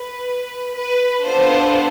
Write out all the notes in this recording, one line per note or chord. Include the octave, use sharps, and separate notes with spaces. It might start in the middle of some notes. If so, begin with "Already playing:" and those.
Already playing: B4
B4
B3 D4 F4 A4 C5